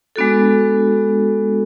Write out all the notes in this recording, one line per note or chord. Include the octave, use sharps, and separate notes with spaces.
G#3 B3 D4 F#4 A4